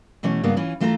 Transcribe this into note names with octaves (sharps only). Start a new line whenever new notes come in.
B2 E3 A3 C#4 C#5
G2 C#3 A#3 B3
E3 C#4 F4
E3 A3 F4 A4 D5 A#5